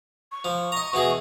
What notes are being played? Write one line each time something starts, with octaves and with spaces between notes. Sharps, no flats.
C#6
F3
D#5 A#5
B2 E3 G#4